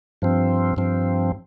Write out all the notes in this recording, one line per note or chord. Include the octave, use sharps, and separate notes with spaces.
G2 F3 C4
G2 F3 C4